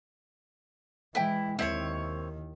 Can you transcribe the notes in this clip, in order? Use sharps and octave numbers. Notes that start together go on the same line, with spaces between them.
E3 G#3 E4 B4 G5
D#2 D#3 C4 E4 C#5 E5